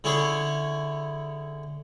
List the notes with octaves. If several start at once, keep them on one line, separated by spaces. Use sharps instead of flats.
D3 C#4 E4 G#4 C#5